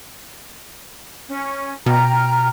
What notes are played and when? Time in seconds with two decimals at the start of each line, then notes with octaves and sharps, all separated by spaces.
1.28 C#4
1.86 B2 G5 A#5 F6